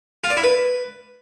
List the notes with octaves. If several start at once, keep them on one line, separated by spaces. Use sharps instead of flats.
F4
D5
E4
B4